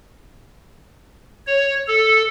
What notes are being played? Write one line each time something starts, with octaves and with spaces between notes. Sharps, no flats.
C#5
A4